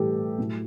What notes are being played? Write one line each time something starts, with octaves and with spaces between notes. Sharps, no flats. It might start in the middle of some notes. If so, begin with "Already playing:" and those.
Already playing: A2 E3 G3 G4 A4
A2 F#3 A3